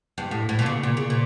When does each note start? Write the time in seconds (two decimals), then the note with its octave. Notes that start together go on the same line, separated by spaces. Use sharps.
0.18 G2
0.31 A2
0.49 A2
0.59 A#2
0.66 C#3
0.83 A#2
0.97 C#3
1.10 A#2